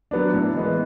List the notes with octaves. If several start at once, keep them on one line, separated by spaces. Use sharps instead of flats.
F#3 B3 D4
A2
E3 G#3 B3